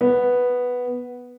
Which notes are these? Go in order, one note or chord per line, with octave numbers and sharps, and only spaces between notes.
B3